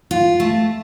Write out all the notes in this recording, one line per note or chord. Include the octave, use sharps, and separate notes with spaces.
F4
A3